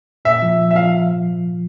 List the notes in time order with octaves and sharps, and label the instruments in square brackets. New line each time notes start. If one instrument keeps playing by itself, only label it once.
[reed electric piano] A#2 [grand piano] E5
[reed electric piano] F3
F3
[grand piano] E5
[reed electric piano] F3 [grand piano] F5